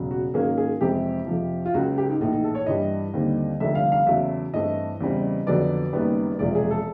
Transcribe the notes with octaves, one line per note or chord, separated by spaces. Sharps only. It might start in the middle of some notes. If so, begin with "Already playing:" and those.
Already playing: E1 C#3 F#3
F#4
G#2 D#3 F#3 A#3 C#4 G#4
G#4
F2 C3 E3 G#3 C4 G4
F2 C3 F3
F4
C#2 C#3 F#3 F#4
G4
D#4
A#1 A2 E3 D#4
D#4
A4
C#5
G2 E3 G3 D#5
D#2 D3 G3 C4
F1 F2 D3 G3 E5
F5
F5
E2 C#3 F#3 A3 E5
G2 E3 A3 C4 D#5
E2 C#3 E3 G3 C4
F2 D3 F#3 B3 D5
F#1 F#2 D#3 G3 B3
E1 E2 C3 F3 G#3 D5
G#4
A4